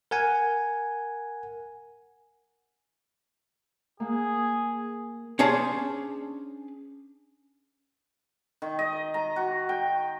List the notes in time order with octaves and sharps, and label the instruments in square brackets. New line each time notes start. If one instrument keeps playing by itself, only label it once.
[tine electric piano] A#4 F#5 G#5
[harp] A#3 F#5 [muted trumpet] G#4
[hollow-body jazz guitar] C#4 D4 G#4 C5 A5
[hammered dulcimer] D#3
D#5
A#5
F#4
G5